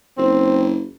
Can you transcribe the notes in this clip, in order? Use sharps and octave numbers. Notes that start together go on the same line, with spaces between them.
F#1 C4